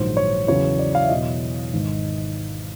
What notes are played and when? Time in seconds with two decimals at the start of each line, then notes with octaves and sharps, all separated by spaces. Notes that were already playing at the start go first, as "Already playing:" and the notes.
Already playing: A#1 G#2 D#3 F#3 C5
0.17 C#5
0.47 E2 C#3 F#3 C#5
0.79 D5
0.95 F5
1.03 E5
1.09 E2 B2 F#3 D#5
1.73 G#1 G#2 D#3